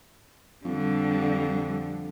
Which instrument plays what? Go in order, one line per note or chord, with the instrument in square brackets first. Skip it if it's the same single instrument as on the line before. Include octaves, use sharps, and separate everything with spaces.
[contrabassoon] F2 [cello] D3 G3